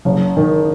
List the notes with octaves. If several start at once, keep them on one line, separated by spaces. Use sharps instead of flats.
F#1
D#3